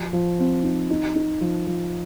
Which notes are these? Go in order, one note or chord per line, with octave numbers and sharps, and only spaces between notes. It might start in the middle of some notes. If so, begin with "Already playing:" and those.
Already playing: F3
F3
C4
D#4
D#4
D#4
F3
F3